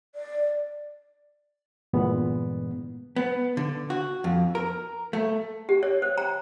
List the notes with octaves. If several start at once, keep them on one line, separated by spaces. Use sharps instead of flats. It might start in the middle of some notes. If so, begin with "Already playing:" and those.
D5
G2 A#2 D3 E3 G#3 B3
B3
D3
F#4
F2
A#4
A3
G4
C#5
C5
A#5